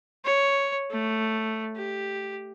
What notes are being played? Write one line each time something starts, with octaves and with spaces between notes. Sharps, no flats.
C#5
A3
G4